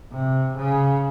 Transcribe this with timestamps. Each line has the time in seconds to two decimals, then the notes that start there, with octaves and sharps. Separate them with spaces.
0.12 C3
0.56 C#3